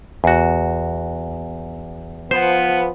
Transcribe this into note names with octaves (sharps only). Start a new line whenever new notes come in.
E2 F#4
F3 B3 C5